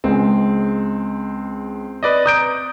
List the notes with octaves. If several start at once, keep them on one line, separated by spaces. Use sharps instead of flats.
C#2 G#3 C4
B4 D5 D#5
A#5 D#6 G6 D7